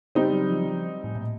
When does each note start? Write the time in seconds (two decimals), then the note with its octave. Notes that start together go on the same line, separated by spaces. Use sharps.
0.15 C#3 G3 C4 D#4
0.32 F#3
0.48 F3
0.66 F3
1.04 A2
1.15 A#2